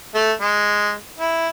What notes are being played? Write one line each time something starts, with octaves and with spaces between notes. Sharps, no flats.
A3
G#3
E4